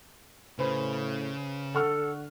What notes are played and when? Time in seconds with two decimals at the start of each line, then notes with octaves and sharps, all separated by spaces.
0.59 A2 C#3 B4 C5 B5
1.75 D3 A4 F#5 C#6 F6